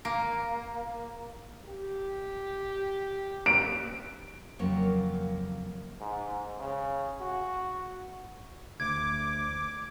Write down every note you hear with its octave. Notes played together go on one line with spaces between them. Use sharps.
A#3
G4
D7
F2 C#3 F#3 A#3 C#5
G#2
C#3
F#4
D2 D6 G#6